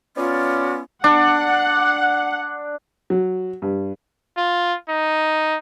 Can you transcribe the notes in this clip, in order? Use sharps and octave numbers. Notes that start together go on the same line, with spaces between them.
B3 C#4 F4 D5
D4 F#5
F#3
G2
F4
D#4